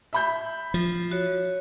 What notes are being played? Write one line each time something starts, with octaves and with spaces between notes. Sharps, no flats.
E5 B5 G6
F3
F#4 C#5